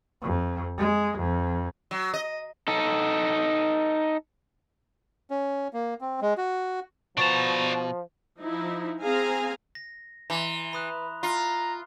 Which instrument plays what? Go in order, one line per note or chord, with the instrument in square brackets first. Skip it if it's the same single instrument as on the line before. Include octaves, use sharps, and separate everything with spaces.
[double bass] F2
G#3
F2
[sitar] F#3
D#5
[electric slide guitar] D#4 A4
[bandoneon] C#4
A#3
C4
G#3
F#4
[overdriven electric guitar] B2 [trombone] F3 [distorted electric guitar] D4 A#5 [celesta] C#6 A6 E7
[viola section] F3 D#4 E4
C4 G#4 F5 G#5 A#5
[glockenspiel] A#6
[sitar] E3 [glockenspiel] A#5 C6 F7
[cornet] B4 [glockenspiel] B5 D#6 F#6
[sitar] F4 [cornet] A#5